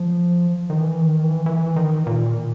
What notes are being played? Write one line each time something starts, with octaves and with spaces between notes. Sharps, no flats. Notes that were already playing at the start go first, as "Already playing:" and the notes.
Already playing: F3
D#3
E3
D#3
E3
E3
D#3
A#2